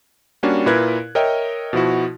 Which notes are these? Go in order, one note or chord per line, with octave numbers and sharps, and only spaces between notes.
G3 A#3 C#4 D4 F#4
A#2 E4 A#4 B4 F#6 G#6
A#4 C#5 D#5 E5 G5
B2 F3 E4 F#4